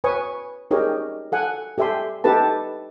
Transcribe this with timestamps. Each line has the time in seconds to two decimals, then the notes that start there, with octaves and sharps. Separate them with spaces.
0.04 B4 C#5 G#5 C#6 D#6
0.71 D#4 G4 G#4 A#4 C#5
1.32 A4 F#5 G#5
1.78 G4 A4 E5 G#5 C6
2.24 D#4 G4 A4 B4 A5